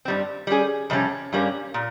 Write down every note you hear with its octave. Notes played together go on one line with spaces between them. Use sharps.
G2 G3 C4
G3 C#4 G#4
F2 C3 G3 C#4
G2 G3 A#3 C#4
A#2